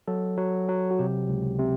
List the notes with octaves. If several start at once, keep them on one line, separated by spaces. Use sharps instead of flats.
F#3 A4
F#3
F#3
F#4
C3 G4
C#2
C3